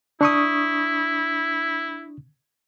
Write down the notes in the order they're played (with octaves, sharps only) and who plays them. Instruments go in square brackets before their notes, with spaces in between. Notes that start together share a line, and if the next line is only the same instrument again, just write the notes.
[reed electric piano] D4 C#6 D#6 [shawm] E4